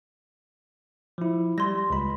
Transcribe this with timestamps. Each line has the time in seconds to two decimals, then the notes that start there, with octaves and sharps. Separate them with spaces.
1.18 F3 E4
1.58 G3 C6 G#6 A#6
1.90 C#2 B5